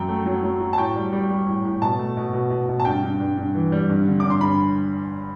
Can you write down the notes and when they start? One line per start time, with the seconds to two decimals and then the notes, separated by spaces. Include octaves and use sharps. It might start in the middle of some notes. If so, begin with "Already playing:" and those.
Already playing: F#2 F#3 G5
0.09 A3
0.26 F#3
0.43 F#3
0.61 F#3
0.73 A5
0.78 A2 G5
0.96 G3
1.12 G3
1.30 G3
1.47 A2
1.65 A2
1.82 B2 A5
1.99 A3
2.17 B2
2.33 B2
2.50 B2
2.69 B2
2.80 A5
2.85 G2 G5
3.03 G2
3.20 G2
3.37 G2
3.55 E3
3.72 G3
3.89 G2
4.07 D3
4.20 G2 D6
4.30 C6
4.41 G2 B5